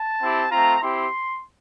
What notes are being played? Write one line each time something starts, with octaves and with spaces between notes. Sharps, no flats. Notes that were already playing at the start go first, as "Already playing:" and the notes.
Already playing: A5
C4 E4 G4
A3 C4 F4 A#5
C4 E4 G4 C6